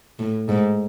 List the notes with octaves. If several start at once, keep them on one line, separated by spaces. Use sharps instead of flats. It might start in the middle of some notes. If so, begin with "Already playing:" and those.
A2
G#2